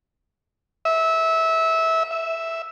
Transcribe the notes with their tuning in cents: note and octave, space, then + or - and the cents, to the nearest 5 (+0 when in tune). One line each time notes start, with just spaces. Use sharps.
E5 -20
E5 +0